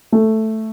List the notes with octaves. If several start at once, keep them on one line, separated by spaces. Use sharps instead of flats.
A3